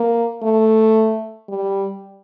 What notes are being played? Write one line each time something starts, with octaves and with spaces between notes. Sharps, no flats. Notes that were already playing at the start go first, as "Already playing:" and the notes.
Already playing: A#3
A3
G3